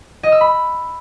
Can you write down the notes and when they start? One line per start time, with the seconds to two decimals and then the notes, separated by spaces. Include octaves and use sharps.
0.23 D#5
0.32 E6
0.41 B5